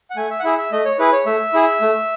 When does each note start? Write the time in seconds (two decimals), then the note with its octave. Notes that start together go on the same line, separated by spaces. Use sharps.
0.11 F#5
0.16 A3 G#5
0.30 E5
0.40 F#5
0.44 E4 G#4 E5
0.58 E5
0.72 A3 D#5
0.85 C#5
0.99 E4 G#4 B4
1.12 C#5
1.26 A3 E5
1.53 E4 G#4
1.81 A3